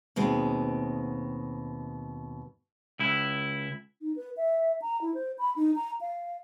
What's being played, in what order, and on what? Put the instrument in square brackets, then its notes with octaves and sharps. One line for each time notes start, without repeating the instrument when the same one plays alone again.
[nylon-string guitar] D#2 B2 G#3 C4
[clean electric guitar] C#2 E4
[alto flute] D#4
B4
E5
A#5
E4
C5
B5
D#4
A#5
F5